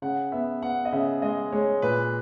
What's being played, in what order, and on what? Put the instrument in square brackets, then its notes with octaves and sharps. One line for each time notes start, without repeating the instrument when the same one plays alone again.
[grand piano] C#3 F#5
B3 E5
B3 F#5
D#5
C#3 E5
G#3 D#5
G#3 C#5
A#2 B4